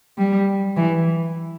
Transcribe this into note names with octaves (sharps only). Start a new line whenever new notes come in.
G3
E3